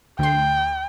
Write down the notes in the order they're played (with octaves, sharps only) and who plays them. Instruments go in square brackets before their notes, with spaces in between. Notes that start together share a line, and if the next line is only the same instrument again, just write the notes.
[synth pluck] D2 C6 [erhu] G5